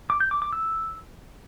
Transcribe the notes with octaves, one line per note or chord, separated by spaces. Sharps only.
D6
G6
D6
D6
E6